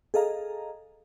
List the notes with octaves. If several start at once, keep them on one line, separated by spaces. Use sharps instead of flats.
G#4 A4 D#5 F5 A#5